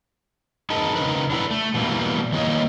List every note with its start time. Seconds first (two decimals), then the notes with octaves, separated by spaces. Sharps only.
0.70 D#4 G#4 A#4 B4 D#5 A5
0.95 C#3 D#4 A#4 B4
1.30 D4 E4 F#4 A4 B4
1.51 A3
1.74 B2 E3 G3 A#3
2.33 D#3 E3 G3 A#3 C#5 D#5